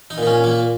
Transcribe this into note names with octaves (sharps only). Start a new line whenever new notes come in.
D#4
A#2
D#4
C#4
A#2 A#3